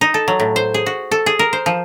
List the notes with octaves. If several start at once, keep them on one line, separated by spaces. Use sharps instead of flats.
D#4
A4
F#3
A2
C5
G#4
F#4
A4
G#4
A#4
C5
F3